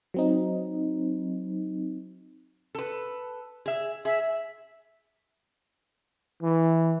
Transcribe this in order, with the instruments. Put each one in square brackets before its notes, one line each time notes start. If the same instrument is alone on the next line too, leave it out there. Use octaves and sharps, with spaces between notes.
[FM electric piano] F#3 C4 D#4
[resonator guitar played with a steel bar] A4 B4
G#4 E5
[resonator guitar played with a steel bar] G#4 [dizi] E5
[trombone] E3